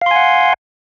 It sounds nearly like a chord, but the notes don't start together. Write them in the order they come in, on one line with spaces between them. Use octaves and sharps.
F5 C6 G#5 F#5